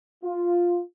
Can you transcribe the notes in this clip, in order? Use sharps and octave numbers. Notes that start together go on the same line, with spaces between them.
F4